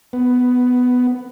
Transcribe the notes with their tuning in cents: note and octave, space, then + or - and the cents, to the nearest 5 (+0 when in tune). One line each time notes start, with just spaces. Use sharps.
B3 +10